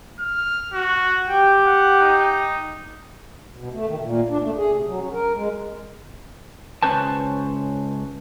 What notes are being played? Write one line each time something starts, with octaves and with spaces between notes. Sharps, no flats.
F6
F#4
G4 G5
F#5
D#4
B2
A3
D#3
A#2
D4
A3
G#4
C3
F#3
C#4
A#4
G#3
C#2 A3 C#4 B4 C5 A5